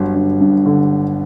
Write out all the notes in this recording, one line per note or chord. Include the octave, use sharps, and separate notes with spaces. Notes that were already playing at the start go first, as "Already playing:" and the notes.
Already playing: G1 G2 D3 F#3
G1
G2
D3